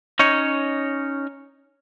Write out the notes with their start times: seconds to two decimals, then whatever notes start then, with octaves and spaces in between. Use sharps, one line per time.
0.19 C#4 D#4 C#5